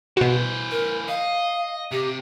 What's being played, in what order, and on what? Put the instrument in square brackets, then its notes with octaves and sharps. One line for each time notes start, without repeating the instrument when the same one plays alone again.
[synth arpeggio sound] B2 F#4 [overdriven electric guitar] E3 C5
[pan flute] A#4
[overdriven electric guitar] D#5 [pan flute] F5
[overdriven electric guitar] C3 [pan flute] G4